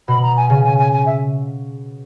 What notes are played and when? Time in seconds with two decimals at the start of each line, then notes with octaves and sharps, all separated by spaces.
0.08 B2 B5
0.22 A#5
0.36 G#5
0.50 C#3 G#5
0.64 G#5
0.78 G#5
0.92 G#5
1.06 E5